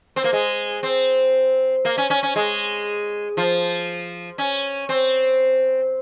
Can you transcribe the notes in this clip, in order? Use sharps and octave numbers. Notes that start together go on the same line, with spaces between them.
C4
A#3
G#3
C4
A#3
C#4
C#4
C#4
G#3
F3
C#4
C4